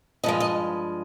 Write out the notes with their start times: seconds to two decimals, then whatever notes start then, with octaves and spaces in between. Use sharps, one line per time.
0.24 G2 F3 G#3 D#5
0.40 D#5